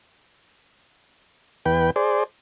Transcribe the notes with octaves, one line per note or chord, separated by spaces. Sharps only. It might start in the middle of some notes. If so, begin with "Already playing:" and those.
E2 B4 G5
G#4 C5 D5